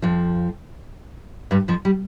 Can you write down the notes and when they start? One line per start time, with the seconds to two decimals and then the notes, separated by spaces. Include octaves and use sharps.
0.02 F2 F3
1.51 G2 G3
1.68 F2 F3
1.85 G3